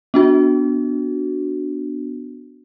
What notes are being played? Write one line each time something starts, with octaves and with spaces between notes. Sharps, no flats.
B3 D4 F#4